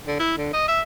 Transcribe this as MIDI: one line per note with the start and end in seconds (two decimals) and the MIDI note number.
0.07 0.18 50
0.19 0.34 64
0.37 0.51 50
0.53 0.65 75
0.68 0.81 76